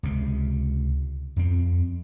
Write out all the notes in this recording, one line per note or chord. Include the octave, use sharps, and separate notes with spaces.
C#2 C3
F2 C4